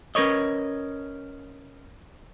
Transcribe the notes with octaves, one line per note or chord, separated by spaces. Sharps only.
C#4 A#4 B4 C#5 D#5